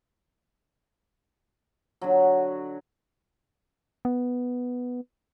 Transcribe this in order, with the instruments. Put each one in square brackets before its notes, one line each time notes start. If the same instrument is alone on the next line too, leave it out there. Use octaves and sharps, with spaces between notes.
[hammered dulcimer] D3 F#3
[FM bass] B3